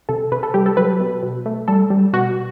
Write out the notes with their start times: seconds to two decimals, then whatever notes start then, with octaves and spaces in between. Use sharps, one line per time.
0.09 C3 A4
0.32 C3 B4
0.43 A4
0.54 G3 G4
0.66 A4
0.77 F#3 B4
1.00 B2
1.23 B2
1.46 A3
1.68 G3 A4
1.90 G3
2.13 B2 F#4